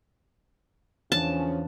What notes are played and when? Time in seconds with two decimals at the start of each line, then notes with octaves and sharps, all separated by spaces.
1.12 E2 C#3 F3 C#4 D4 A5